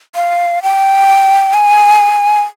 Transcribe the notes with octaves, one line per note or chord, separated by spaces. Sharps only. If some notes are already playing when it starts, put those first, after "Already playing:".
F5
G5
G#5